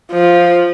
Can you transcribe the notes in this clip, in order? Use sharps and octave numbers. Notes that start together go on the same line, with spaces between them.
F3